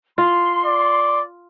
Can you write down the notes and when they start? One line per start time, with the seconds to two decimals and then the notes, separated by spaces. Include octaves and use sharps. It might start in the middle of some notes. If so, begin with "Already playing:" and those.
0.18 F4 C6
0.65 D5